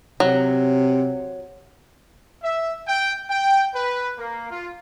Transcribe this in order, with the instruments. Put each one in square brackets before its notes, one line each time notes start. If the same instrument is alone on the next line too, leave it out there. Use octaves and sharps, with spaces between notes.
[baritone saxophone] C3 [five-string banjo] F#3
[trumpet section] E5
G5
G5
B4
A#3
F4